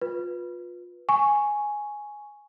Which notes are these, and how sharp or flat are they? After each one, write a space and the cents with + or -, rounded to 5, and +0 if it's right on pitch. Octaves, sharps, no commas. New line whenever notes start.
F4 +25 B4 -15
G#5 +0 C#6 +0